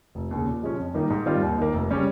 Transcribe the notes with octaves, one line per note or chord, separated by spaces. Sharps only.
F1
D#2 C#3
A#2
F3 G#3 C#4
F2
D#3 G3 A#3 D#4
G#2
D#3 G3 C4 F4
D#2
D#3 A#3
F1
C#3 G3 C#4